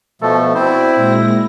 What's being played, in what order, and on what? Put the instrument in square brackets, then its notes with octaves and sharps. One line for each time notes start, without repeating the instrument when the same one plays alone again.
[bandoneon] B2 F3 A3 [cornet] A4
[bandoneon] C4 C5 [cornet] E4 [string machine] F#4 D5
[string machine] A#2 G#3 A#6